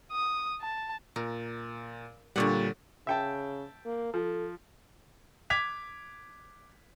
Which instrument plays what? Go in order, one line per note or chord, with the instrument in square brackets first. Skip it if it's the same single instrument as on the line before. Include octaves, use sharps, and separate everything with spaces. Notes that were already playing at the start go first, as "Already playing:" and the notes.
[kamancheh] D#6
A5
[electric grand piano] A#2 [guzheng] A#4
[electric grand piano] A#2 G3 [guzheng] D3 C#5 F#5
[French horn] C#3 [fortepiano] E5 G5 A5
[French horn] A#3
[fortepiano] F3 [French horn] A4
[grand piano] D6 G#6 B6 F7